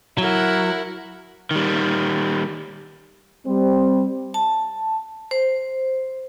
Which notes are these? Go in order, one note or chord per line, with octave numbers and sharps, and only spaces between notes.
F#3 E4 A#4 F#5
D#3 G3
G3 C4
A5
C5